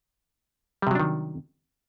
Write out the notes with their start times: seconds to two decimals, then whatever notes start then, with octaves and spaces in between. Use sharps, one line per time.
0.82 G3
0.87 C3
0.91 F#3
0.95 D4
1.00 D#3